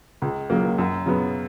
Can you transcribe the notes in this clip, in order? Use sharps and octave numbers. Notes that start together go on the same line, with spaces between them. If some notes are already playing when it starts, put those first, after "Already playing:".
C#2
C#3 F#3 A#3
F#2
C#3 F#3 B3